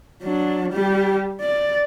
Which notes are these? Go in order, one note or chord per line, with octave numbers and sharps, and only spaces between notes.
F#3 D4
G3 G4
D5